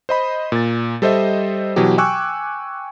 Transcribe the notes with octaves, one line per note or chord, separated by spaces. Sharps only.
C5 D#5 B5
A#2 A6
G3 A4 C5 D#5 E5
B2 E3 F#3 G4
G5 G#5 C#6 D6 E6 F#6